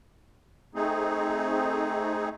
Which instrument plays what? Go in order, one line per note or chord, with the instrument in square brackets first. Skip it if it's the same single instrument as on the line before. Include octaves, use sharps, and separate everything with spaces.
[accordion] A3 C4 D#4 G#4